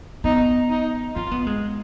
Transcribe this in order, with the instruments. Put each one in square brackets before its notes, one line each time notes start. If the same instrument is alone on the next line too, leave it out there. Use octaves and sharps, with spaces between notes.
[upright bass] B3 [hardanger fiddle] D#4
[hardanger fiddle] D#4
[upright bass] C#4 [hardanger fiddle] F4
[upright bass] B3
G#3